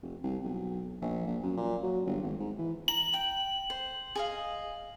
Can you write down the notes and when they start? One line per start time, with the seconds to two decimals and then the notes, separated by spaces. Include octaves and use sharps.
0.03 F1
0.23 C2
0.44 B1
1.02 A#1
1.27 A#1
1.43 F#2
1.57 A#2
1.83 F#3
2.06 G1
2.22 G#1
2.40 G#2
2.59 E3
2.88 A#5 F#7
3.14 G5
3.70 C5
4.15 G#4 D#5 F5